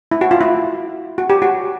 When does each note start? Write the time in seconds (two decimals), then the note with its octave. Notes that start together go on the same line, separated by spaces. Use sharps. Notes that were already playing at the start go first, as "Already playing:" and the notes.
0.12 E4
0.21 F#4
0.31 F4
0.41 E4
1.18 F#4
1.30 G4
1.42 F#4